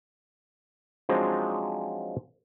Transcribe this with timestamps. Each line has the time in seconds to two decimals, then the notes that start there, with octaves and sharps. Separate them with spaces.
1.09 F3 F#3 G#3 C4 D4 D#4